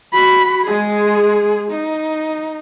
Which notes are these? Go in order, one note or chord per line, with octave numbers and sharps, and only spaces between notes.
F#4 B5
G#3 G#4
D#4